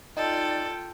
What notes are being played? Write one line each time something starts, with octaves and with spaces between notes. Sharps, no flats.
D#4 F4 A4 D5 G5